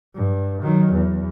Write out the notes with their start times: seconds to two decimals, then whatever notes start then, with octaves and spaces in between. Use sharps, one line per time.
0.15 G2
0.62 D#3 F#3
0.92 E2